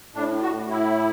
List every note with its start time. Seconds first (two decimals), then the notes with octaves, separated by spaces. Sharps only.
0.15 A2 D4
0.43 F#4
0.57 A2
0.70 E4